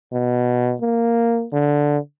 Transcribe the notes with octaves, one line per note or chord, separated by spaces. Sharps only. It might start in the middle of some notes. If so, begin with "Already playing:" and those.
B2
A#3
D3